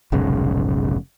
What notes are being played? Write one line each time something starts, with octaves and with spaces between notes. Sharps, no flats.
F1 B1 G#2 C#3